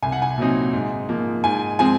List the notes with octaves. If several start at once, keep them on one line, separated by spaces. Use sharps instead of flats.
C2 G#5
F#5
G#5
A#2 F#3 C4 D#4
G#2
F3 A#3
G#2 G#5
F3 G#3 C4 G#5